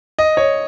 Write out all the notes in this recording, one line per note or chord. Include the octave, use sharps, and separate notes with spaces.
D#5
C#5